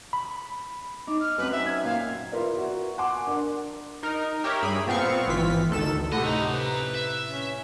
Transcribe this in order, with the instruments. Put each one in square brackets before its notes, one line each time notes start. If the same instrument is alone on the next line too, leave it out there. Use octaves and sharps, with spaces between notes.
[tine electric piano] B5
[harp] D#4 [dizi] D6
[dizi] F6
[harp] F#2 C4 [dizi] B4
[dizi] E5
G#6
[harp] A#2 [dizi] F5
[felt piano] E4 F4 A#4 B4 D5
F#4 A#4
F#5 G#5 C6 D6
D4 A#4
[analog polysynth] D#4 A#4
G4 A#4 C#5 E5
G2 G#4 B5
A#2 B3 C4 F5 C#6
G#1 E3 F4 B6
D2 D#3 A4 E7
[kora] A2 C3 [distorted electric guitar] D#5 [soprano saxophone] F#5
[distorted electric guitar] C#4 A#5 [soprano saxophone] D#4
[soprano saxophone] B4
[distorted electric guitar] E5
[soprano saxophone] C#4